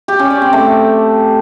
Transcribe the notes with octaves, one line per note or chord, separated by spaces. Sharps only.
G4
C#4
D5
C4
A3